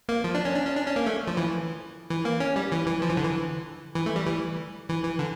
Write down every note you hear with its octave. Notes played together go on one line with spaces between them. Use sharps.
A#3
F3
D4
C#4
D4
C#4
D4
C#4
A#3
A3
F3
E3
E3
A#3
C#4
G3
E3
E3
F3
E3
D3
E3
E3
A3
G3
E3
E3
E3
D3